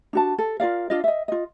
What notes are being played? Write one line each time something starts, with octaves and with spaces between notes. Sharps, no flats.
D4 F#4 A5
A4
F4 A#4 D5 F5
D4 F4 D#5
D#5 E5
F4 D#5